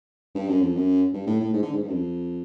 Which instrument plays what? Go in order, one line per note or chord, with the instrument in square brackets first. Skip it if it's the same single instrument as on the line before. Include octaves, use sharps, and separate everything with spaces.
[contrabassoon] G2
F#2
F2
F#2
G2
A2
A2
G#2
D3
G#2
G2
F#2
F2